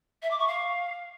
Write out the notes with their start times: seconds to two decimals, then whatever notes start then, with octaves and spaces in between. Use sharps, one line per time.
0.22 E5
0.31 D6
0.39 C#6
0.47 F5